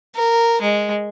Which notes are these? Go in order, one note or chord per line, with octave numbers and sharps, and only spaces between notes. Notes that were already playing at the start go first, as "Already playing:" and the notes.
A#4
G#3